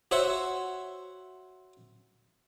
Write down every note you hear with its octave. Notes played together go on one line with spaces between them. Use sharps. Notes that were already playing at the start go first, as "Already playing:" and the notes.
F#4 C5 C#5 E5 F#5